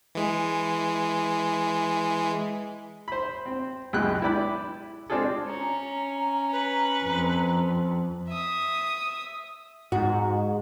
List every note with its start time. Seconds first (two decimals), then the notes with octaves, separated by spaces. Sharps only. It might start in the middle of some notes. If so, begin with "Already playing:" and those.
0.15 E3 G#3
3.08 C5 B5
3.46 C4
3.93 C#2 F#2 B2 G#3 G5 F#6
4.22 E4 G4 B4 D5 G5 B5
5.10 G#3 C4 D4 F4 G#4 A4
5.45 C#4 A#5
6.52 B4
7.04 F2
8.28 E5 D#6
9.92 G#2 F#4